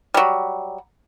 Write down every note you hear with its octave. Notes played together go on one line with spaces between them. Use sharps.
F#3 G3